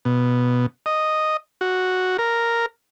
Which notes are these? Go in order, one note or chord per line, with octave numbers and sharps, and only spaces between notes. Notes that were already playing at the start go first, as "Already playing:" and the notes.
B2
D#5
F#4
A#4